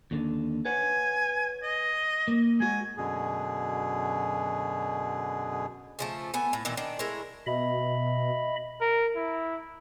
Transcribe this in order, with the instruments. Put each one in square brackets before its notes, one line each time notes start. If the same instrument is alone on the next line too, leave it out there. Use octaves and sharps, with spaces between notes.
[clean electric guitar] D#2 D3
[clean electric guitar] B4 C#5 F#5 [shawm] G#5
[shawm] D#5
[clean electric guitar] A#3
[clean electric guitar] G#3 F#4 [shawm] G#5
[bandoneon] F#2 B2 D3 G#4
[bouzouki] C#3 F3 A3
A3 B3 G#5
A2
A#2 D#3 E3
D#3 D4
G#3 A3 E4 A#4
[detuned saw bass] B2 [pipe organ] D#5 E5 B5
[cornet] A#4
E4